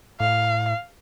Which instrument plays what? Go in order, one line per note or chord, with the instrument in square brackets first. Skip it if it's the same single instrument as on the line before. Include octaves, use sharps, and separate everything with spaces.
[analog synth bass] A2 [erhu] F5